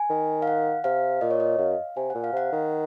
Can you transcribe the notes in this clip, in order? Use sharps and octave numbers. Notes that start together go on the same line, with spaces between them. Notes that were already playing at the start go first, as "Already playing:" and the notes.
Already playing: G#5
D#3
F5
F#5
C3 F5
A#2 D#5
C#5
D#5
F#2 F5
C3 G#5
A#2 F#5
F5
C3 F#5
D#3